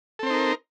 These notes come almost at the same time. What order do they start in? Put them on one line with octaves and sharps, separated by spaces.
A4 C4 C5 D#4 A#4